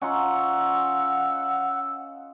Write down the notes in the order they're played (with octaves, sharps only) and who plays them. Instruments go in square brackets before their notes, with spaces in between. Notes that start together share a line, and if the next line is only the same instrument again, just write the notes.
[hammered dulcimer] C#4 D#4 F4 [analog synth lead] F#5 [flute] E6